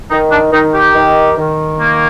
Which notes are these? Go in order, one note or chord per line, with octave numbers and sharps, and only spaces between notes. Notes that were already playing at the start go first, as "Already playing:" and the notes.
D#3 D#4
D4
D#3 D#4
G4
D#3
D#3
A#3